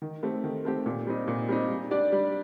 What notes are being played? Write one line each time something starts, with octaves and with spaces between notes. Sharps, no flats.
D#3
A3 C4 G4
D#3
A3 C4 G4
A#2
G3 C4 D#4
A#2
G3 C4 D#4
G3
D4 G4 D5
G3